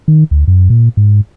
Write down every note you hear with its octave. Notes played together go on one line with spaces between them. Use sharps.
D#3
D2
F#2
A#2
G#2